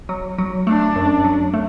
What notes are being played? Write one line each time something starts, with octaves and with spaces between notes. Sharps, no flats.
F#3
F#3
A3 D4
F#2
F#3
A3